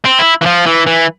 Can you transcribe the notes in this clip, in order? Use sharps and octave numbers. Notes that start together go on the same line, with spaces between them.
C4
E4
E3
F3
E3
E3